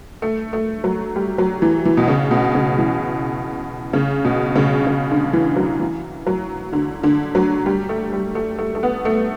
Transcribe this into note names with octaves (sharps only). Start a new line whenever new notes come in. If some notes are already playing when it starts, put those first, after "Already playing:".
A3
A3
F#3
G3
F#3
E3
E3
B2
C#3
B2
C#3
E3
C#3
B2
C#3
C#3
D3
E3
F#3
E3
F#3
D3
D3
F#3
G3
A3
G3
A3
A3
A3
B3
A3